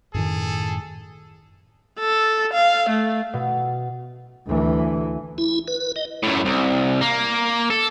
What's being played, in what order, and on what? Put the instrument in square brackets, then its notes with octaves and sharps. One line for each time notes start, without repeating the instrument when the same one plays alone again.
[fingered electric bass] F#2 A2 D#3 [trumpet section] G#4 A4
[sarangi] A4
F5
A3
[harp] B2
[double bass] D2 E3
[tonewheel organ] E4
B4
D#5
[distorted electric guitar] F#2 A2
C2
A#3
A4